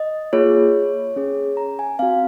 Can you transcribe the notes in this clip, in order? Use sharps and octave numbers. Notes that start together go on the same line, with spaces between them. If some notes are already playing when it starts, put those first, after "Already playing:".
Already playing: D#5
A#3 F4 G#4 C#5
C#4 G#4
A#5
G#5
C4 F#4 F5